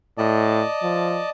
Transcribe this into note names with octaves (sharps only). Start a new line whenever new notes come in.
A2 D5 D#5 A5
F3